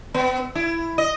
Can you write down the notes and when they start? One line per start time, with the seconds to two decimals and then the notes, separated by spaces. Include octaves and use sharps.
0.14 B3
0.55 E4
0.98 D#5